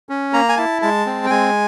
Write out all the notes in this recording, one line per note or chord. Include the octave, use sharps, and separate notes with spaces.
C#4
A#3 A#5
G#5
E4 A5
G#3 A5
C4
G5
G#3 G#5